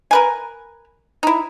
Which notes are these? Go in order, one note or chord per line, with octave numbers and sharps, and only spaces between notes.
A#4 B4 G#5
D#4 E4